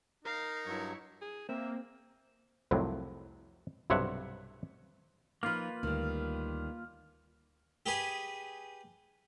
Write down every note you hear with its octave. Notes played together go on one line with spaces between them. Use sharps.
D#4 A#4 F5
G2 F#3 E4 C#5
G#4
A#3 C4 E5
C2 F2 A2 C3 F#3
B1 G2 C3 C#5 E5 F#5
F3 A#3 D#4 F4 B4 F6
D2 D#3 G3
G4 G#4 B4 G#5